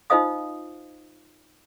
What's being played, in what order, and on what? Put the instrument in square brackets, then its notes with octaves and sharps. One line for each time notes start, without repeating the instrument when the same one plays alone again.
[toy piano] D#4 F4 C5 D#5 F5 D#6